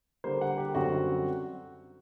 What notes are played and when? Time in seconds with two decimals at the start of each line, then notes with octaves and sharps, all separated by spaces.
0.24 D3 G3 A#3 C5
0.41 F#5
0.58 G4
0.75 F#2 D3 G3 C4 F#4